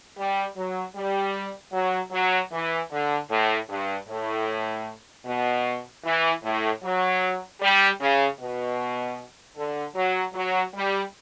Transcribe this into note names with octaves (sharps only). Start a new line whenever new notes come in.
G3
F#3
G3
F#3
F#3
E3
D3
A2
G2
A2
B2
E3
A2
F#3
G3
C#3
B2
D3
F#3
F#3
G3